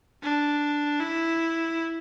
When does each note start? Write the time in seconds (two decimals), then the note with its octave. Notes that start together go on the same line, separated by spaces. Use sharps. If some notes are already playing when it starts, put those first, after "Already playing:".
0.23 D4
1.00 E4